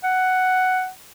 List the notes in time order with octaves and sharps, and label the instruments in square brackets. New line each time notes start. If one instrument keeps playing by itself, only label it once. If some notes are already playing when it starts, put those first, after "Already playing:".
[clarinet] F#5